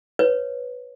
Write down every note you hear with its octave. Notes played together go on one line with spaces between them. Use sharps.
B4 C#5